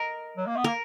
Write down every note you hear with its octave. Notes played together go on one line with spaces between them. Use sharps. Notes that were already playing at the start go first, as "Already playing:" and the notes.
Already playing: A#4 D#5
F#3
A#3
B3
A#3 A#4